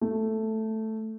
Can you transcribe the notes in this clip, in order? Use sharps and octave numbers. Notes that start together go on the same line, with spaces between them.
A3